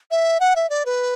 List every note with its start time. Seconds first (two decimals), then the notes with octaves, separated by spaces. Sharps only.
0.11 E5
0.40 F#5
0.56 E5
0.70 D5
0.86 B4